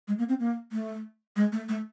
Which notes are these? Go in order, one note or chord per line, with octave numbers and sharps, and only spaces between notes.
G#3
A#3
C4
A#3
A3
G#3
A3
A3